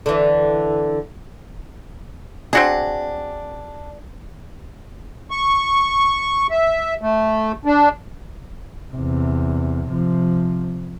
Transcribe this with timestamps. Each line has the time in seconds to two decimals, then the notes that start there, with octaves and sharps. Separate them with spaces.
0.06 D3 E3
2.53 C4 D4 F#4 G#4
5.31 C#6
6.50 E5
7.01 A3
7.65 D4
8.94 E2 C3
9.88 C3 F3